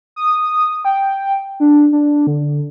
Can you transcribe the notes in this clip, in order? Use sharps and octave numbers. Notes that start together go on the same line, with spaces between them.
D#6
G5
D4
D4
D3